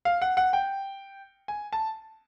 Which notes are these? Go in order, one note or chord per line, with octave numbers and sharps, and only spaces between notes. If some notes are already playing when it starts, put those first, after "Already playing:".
F5
F#5
F#5
G5
G#5
A5